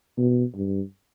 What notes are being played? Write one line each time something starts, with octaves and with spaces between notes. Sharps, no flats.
B2
G2